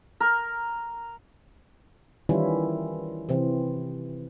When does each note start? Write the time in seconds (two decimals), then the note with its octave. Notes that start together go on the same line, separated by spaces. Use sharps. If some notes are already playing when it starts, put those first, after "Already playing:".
0.20 A#4
2.29 D#3 E3 G3 C#4 E4 F4
3.29 C3 E3 C4